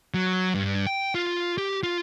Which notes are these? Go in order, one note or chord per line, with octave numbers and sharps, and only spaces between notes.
F#3
G2
G5
F4
G4
F4